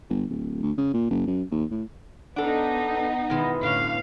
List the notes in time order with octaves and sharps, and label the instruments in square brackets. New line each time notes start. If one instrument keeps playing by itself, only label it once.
[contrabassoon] G1
D1
D2
C#3
A#2
F#1
F#2
D#2
A2
[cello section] B3 D#4 [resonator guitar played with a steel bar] D4 A4 [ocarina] F#5
[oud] B2 E3 E4 [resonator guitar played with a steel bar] D#3 G#3
[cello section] A2 F5 [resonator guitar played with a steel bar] D3 C#4